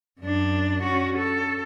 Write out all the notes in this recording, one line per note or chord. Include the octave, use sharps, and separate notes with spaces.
F#2 D4
C#4 F#4
A4